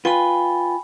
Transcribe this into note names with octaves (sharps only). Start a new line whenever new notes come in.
F4 B4 G5 G#5 B5